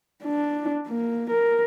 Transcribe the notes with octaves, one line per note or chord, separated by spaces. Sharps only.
D4
A#3
A#4